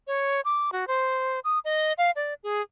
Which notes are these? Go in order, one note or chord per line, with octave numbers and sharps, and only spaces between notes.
C#5
D6
F#4
C5
D#6
D#5
F5
D5
G#4